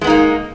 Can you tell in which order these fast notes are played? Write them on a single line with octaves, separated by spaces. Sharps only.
G#3 B3 D#4 A#3